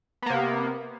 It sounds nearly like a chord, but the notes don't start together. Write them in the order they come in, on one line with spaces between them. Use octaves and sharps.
B3 A#3 C3